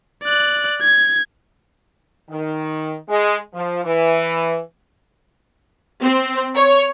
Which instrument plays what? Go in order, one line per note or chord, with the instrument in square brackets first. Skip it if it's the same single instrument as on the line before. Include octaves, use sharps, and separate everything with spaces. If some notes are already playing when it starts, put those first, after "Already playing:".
[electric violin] D5 F#6
G#6
[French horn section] D#3
G#3
F3
E3
[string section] C4
C#5